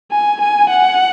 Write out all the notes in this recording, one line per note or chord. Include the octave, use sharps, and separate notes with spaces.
G#5
G#5
F#5